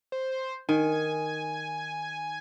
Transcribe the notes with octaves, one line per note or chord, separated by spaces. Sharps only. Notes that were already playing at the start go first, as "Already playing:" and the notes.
C5
D#3 G#5